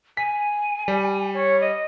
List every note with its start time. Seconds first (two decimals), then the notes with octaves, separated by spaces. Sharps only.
0.17 G#5 B6
0.88 G3
1.34 C#5
1.61 D#5